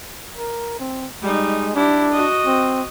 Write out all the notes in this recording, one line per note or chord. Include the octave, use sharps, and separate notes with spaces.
A#4
C4
G3 G#3 D#4
D4 E4 G4
F#4 D#5
C4